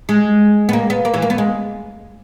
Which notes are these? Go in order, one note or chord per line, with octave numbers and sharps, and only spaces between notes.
G#3
B3
A#3
B3
A#3
E3
A#3
B3
G#3